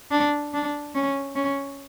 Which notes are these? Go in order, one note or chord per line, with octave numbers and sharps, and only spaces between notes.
D4
D4
C#4
C#4